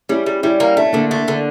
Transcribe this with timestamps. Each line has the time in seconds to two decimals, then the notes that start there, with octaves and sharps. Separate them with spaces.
0.09 G3 C#4 E4
0.26 G3
0.43 G3 C#4 E4
0.60 A#3
0.77 A3 D4
0.85 C#4
0.93 D3 A#3 D4
1.11 A3
1.28 D3